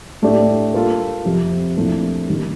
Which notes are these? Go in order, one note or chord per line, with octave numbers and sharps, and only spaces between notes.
A2 A3 D4 G4 D5
G3 A#3 F4 A4
F2 C3 F3
C2 A#2 F3 A3 D4
D#2 D#3 G3